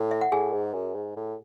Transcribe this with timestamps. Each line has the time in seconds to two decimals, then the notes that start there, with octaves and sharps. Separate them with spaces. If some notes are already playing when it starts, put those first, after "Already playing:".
Already playing: A2
0.11 E5
0.21 F#5
0.32 A2 G#4 G#5
0.53 G#2
0.74 F#2
0.95 G#2
1.16 A2